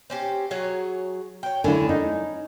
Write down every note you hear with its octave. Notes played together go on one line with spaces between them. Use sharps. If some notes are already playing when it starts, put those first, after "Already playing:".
C4 C#4 G4
F#3 G#4 C#5
C#5 G5
D3 C#4 E4 G#5
D#4